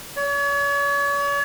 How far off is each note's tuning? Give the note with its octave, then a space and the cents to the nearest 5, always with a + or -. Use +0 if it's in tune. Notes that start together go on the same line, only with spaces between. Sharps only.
C#5 +40